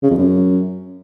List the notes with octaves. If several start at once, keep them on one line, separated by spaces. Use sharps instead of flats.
C#3
F2
F#2